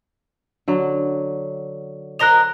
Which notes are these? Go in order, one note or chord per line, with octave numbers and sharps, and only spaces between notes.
D3 F#3
A#4 C5 D#5 F#6 A#6 F7